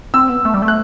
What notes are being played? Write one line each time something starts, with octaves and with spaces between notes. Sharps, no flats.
C4 E6
B3
A3
G3
A3
F#6